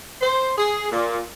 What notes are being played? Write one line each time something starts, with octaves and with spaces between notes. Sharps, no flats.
C5
G#4
A#2